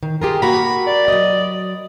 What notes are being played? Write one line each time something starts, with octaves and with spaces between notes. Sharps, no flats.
D#3
F4 G4 G#4 A#4
A#3 F#4 A#5 B5
D5
F#3 D#5